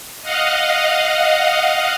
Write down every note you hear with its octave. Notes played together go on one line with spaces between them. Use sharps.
D#5 F5 F#5